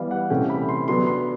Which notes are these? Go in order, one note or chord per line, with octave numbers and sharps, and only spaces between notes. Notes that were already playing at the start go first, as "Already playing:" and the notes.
Already playing: E3 G3 B3 F5
F#5
C3 E3 A3 C#4 G5
B5
C6
D3 F#3 B3 D4 C6
C6